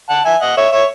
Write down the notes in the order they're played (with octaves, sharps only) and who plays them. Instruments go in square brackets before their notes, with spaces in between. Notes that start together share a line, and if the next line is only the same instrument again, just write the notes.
[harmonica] F#5 A5
E5 G#5
D#5 F#5
C#5 E5
C#5 E5